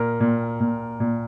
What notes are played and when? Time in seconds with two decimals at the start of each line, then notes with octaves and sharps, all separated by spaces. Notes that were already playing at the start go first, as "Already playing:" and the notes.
Already playing: A#2 A#4
0.20 A#2
0.60 A#2
1.00 A#2